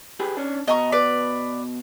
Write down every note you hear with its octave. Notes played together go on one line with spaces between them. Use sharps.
G4 G#4 B4
C#4 D4
B2 D#5 A#5 C#6
B4 D5